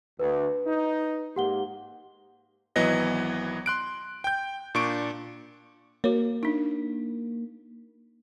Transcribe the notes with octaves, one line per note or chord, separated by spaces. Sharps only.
D2 B4
D#4
G#2 A#3 G4 F#5 G7
G#1 E3 F#3 B3 D#5 A#6
C6 F#6 D7
G5 G6
A#2 D4 C#6 D7
A#3 F#4 C#5
D4 D#4